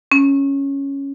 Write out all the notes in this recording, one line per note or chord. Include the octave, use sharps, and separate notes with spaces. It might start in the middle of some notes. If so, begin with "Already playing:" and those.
C#4